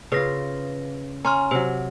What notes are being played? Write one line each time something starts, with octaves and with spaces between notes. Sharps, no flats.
C#3 F4 B4 A#6
C#4 A#5 C6 F6
C3 F#3 C5